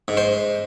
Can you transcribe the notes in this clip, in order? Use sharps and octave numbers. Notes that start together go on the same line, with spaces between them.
G#2
C5